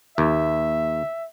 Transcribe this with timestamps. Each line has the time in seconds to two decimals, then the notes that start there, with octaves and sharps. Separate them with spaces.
0.18 D#2 E5